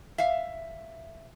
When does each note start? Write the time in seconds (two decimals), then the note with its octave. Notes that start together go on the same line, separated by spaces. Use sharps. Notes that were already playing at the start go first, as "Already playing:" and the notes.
0.18 E5 F5